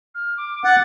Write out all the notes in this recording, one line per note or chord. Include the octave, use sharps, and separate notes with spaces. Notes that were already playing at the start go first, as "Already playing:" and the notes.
F6
D6
F#5 A6